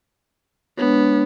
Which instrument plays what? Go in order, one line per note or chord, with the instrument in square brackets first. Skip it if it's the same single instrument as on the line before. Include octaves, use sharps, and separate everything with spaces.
[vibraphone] G#3 D4 C#5 [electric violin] B3